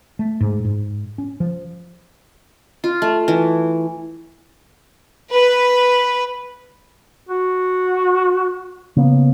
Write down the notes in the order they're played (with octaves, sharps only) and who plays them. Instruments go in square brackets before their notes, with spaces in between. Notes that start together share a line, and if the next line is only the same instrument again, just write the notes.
[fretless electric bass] A3
G#2
G#2
C#4
F3
[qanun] F4
A3
E3
[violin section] B4
[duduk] F#4
[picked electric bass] C#3 A#3 B3